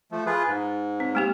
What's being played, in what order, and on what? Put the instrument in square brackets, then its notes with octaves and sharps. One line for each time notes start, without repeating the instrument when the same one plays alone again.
[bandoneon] F3 A3
F4 G#4 B4
G#2
[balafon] C4
G#3 A#3 G4